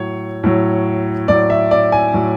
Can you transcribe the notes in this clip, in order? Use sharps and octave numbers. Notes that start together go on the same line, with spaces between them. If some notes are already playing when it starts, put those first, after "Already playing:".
Already playing: A2 F#3 C#5
A2 F#3
A2 F#3 D5
E5
D5
G#5
A2 F#3